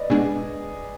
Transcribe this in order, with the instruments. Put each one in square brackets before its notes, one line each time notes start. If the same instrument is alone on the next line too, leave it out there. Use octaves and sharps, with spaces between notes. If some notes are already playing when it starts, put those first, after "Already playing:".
Already playing: [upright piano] B4 D5 D#5
[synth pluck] B2 G#3 D4 [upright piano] G#4